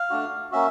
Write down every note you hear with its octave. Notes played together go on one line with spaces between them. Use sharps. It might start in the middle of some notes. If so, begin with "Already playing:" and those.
Already playing: F5
A3 D4 F#4
A#3 C#4 F#4 E5